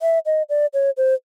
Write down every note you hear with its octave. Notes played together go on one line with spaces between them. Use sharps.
E5
D#5
D5
C#5
C5